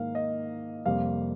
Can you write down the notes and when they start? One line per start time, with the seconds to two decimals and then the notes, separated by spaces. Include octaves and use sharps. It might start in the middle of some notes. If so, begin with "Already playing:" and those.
Already playing: G#2 D#3 A#3 F5
0.15 D#5
0.85 F2 C3 G3 A#3 F5